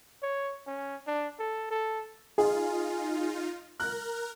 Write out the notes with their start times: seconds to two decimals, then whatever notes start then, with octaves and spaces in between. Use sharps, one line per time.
0.22 C#5
0.67 C#4
1.07 D4
1.39 A4
1.71 A4
2.38 D#4 F4 G#4
3.80 A#4 F#6